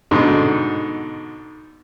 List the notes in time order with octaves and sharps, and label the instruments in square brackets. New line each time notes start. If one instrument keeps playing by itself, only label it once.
[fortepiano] G#2 B2 D3